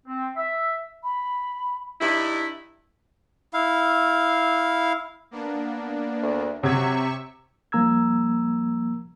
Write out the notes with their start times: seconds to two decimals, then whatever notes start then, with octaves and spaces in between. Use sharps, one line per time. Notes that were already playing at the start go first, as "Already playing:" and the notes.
0.07 C4
0.36 E5
1.04 B5
2.00 G2 D#4 E4
3.53 E4 F5
5.31 A#3 B3 D4
6.23 D2
6.63 C3 F#3 E5 C#6 G#6
7.72 F3 G3 A#3 A#5 E6 G#6